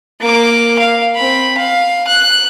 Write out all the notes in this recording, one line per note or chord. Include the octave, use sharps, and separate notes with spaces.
A#3 D6
F5
C4 B5
F5
F#6